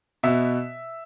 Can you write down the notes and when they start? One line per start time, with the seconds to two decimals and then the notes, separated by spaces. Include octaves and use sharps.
0.23 B2 B3 E5